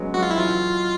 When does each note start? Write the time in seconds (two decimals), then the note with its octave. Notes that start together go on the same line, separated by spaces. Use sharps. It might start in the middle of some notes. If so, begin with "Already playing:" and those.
Already playing: F#3 G#3 B3 C#4
0.14 F#3 G#3 F#4
0.23 F4
0.30 E4
0.38 E3 F#3 F4